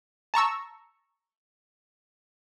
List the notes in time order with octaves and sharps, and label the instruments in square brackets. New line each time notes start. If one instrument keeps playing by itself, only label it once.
[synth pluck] A5 A#5 C#6 E6